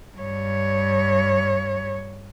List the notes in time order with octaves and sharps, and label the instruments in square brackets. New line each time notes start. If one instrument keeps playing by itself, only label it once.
[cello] G2 C#5